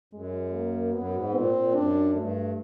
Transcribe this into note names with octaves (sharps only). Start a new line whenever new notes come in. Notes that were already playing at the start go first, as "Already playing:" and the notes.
F#2 G#3
A#3
F#2 B3
G#2
A#2 C4
A#2
F#2 D4
G2 A3